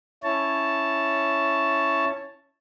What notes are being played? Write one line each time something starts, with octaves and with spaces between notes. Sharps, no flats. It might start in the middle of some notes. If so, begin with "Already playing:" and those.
C#4 E4 C#5 A5